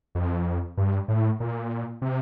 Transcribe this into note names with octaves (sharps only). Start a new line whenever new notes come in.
F2
G2
A2
A#2
C3